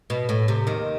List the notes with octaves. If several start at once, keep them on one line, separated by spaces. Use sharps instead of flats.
B2
A2
C3
D#2 D#3